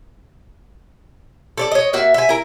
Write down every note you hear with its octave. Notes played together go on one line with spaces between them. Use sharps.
A4 C#5 D5
C#5 D#5
A#3 F#4 E5
E5 G#5
E4 A#4